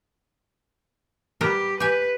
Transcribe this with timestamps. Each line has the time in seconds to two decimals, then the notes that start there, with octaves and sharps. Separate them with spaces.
1.41 G3 B3 G4 A#4
1.80 G4 B4 G#5